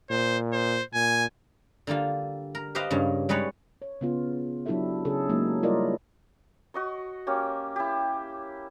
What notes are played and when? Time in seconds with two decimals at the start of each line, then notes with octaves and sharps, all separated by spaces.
0.10 A#2 C5
0.53 C5
0.94 A#2 G#5
1.87 D3 G3 A#3 F4
2.55 A#4
2.75 G4 B4 C5 D#5 F5
2.90 G2 C#3 A#3
3.29 G3 G#3 D#4 B4 C#5
3.82 C#5
4.01 C#3 B3 F4
4.66 F#3 D4 E4 G4 A4 E5
5.05 C#3 G#4 A4
5.29 F#3 G#3 A#3 D#4
5.63 G3 E4 F4 A#4 D5 D#5
6.74 F#4 D#5 C#6
7.27 A#3 C#4 G4
7.76 E4 G4